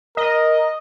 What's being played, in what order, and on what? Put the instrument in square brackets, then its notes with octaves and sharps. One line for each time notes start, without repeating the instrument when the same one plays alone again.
[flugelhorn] A#4 [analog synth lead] D#5